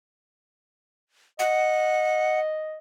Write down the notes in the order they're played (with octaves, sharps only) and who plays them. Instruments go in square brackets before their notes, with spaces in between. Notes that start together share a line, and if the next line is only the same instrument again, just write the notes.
[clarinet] D#5 [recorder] F#5